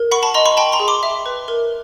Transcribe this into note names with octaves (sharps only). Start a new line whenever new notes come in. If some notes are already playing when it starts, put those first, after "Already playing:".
Already playing: A#4
F#5 B5 C#6
A5 B5
D#5 A#5 C6
B5 C#6
G5 A5 B5
A#5 C6
G#4
C6 D6
E5
B4
A#4